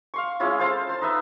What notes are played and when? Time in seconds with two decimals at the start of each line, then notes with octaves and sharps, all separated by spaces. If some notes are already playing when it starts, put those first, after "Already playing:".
0.14 F5 C6 C#6
0.40 G#3 C#4 E4 F4
0.59 A4 C5 F5 A5
0.89 A5 C6
1.01 D#4 B4 E5